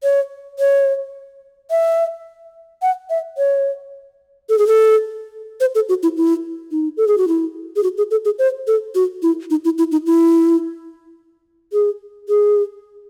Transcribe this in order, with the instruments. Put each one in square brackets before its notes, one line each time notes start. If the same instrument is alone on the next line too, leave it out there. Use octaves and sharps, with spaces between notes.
[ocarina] C#5
C#5
E5
F#5
E5
C#5
A4
G#4
A4
C5
A4
F#4
E4
E4
D#4
A4
G#4
F#4
E4
G#4
F#4
G#4
A4
G#4
C5
A4
F#4
E4
D#4
E4
E4
D#4
E4
G#4
G#4